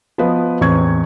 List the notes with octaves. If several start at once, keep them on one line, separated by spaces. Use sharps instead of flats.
F3 B3 B4 D#5
A1 E2 C4 C#6 G#6